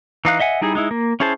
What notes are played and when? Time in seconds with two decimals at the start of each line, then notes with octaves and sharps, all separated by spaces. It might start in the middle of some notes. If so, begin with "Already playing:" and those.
0.25 E3 D#4 F5 F#6
0.40 D#5 E5 F#5 G#5
0.61 G3 D#4 E4 G#4
0.75 G#3 D#4 E4
0.91 A#3
1.20 C#4 E4 G#4 C5 A5